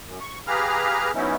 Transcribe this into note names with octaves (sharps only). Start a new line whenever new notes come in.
F#2
C#6
G4 G#4 B4 F5 A#5 F6
G#2 F#3 B3 C#4 D#4 E4